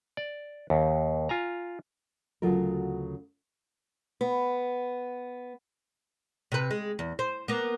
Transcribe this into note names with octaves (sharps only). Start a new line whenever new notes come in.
D5
D#2
F4 G#5 A#5
D2 C#3 F#3 F4 A4 A#4
B3
C3 B4
G#3
E2
C5
A#3 B3